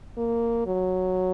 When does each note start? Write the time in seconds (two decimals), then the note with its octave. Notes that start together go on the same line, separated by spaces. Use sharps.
0.17 A#3
0.66 F#3